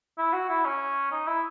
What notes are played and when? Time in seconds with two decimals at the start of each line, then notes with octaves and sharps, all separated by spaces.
0.18 E4
0.33 F#4
0.49 E4
0.65 C#4
1.12 D#4
1.27 E4